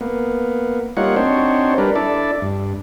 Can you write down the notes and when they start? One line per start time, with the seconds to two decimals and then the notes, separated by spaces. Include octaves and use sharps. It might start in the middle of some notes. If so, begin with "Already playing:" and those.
0.01 A#3 B3
0.97 G3 A#3 D#4 F4 C#5 F#5
1.16 C4 D4 D#4 F#4 C5 C#5
1.78 G3 D4 A#4 B4
1.96 D4 E4 A4 D5
2.42 G2